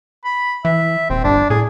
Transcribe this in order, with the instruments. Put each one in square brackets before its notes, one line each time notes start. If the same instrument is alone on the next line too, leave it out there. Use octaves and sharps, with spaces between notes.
[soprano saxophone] B5
[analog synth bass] E3 [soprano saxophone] E5
[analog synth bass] D#1 [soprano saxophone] C4
[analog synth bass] G1 [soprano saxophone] D4
[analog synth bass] A2 [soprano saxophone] G#4